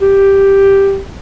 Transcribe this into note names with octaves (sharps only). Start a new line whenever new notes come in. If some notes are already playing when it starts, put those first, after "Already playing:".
G4